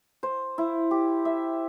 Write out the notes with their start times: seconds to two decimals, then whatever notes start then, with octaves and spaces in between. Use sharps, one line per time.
0.23 C5
0.58 E4
0.91 G4
1.25 E5